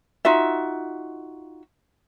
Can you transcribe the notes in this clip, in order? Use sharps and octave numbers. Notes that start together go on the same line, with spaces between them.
D#4 F4 F#4 E5